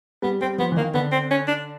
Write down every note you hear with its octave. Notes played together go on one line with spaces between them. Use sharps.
G3 B3
G3 C4
F3 B3
E3
D#3 A#3
D3 B3
C4
C#4
D4